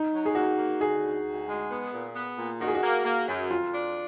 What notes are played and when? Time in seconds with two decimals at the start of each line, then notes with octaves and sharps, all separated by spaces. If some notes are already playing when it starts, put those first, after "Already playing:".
Already playing: D#4
0.13 F#3
0.26 G#4
0.35 A#3 F#4
0.58 A#3
0.80 D3 G#4
1.03 D2
1.26 D2
1.48 G#3
1.70 B3
1.93 A#2
2.15 B3
2.38 A#2
2.61 D#3 F#4
2.67 G#4
2.75 F#4
2.83 A#3
3.05 A#3
3.28 F#2
3.51 F2 F4
3.73 D4